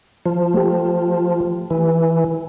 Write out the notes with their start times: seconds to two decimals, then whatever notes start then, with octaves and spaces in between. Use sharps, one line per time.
0.26 F3
0.54 A3 G4
1.70 E3